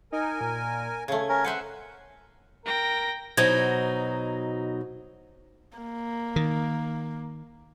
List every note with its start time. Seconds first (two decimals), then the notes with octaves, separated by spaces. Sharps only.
0.12 D#4 A#4 G#5
0.41 A#2
1.08 C#3 A3 G#6
1.29 C#4 A#4
1.44 B4 C5 E5 F#5
2.66 A#4 G5 A#6
3.37 B2 F#3 D#4 C5 G#6
5.78 A#3
6.36 D#3